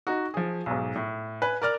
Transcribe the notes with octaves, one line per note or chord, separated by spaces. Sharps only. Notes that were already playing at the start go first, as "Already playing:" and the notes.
D#4 F#4
F3 G#4
B1 G#2
A2
B4 G#5
A#4 D5 D6 F6